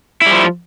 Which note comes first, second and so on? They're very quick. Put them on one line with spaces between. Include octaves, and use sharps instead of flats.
E4 G3 F3